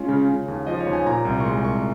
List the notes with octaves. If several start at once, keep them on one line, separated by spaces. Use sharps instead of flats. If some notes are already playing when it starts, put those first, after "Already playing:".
Already playing: G#3 C#4 F4
C#3
C#3
D#2
F3 D#5
C#5
D#2
G#5
A#2 A#5
C2
C#6
G#3 C6
C2 C#6